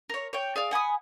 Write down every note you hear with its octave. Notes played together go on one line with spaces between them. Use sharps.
A#4 C#5
C#5 G5
G#4 D5 F5
F#5 G#5 B5 D#6